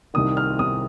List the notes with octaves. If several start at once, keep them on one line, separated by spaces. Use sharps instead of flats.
C2 C3 D#3 D#6
F6
C2 C3 D#3 D#6